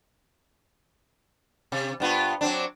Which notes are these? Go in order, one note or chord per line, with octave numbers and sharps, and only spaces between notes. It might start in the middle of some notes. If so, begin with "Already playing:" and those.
C3
G2 B3 F4
F#3 C4 D4